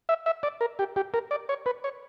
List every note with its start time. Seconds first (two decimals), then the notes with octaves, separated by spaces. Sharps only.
0.09 E5
0.26 E5
0.43 D5
0.61 A#4
0.79 G4
0.96 G4
1.14 A#4
1.31 D5
1.49 C#5
1.66 B4
1.84 C#5